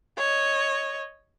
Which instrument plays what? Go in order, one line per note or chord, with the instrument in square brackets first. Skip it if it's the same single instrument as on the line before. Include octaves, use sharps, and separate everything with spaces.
[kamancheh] C#5 D#5